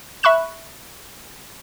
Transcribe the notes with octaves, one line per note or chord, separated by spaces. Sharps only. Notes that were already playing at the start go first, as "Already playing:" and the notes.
E5 B5 C#6 F#6 E7